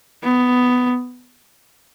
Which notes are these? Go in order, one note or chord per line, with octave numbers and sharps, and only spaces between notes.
B3